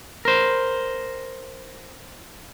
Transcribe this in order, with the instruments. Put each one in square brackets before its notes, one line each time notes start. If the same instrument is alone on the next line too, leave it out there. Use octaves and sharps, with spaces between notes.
[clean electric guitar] A#4 C5